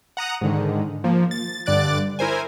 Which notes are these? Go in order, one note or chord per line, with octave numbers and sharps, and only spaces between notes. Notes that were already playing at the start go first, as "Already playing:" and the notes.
F#5 A#5 D#6 F#6
G#2 D3 D#3
F3 A#3
A6
G2 D3 D5 D6 F#6 A6
E4 A#4 C5 G#5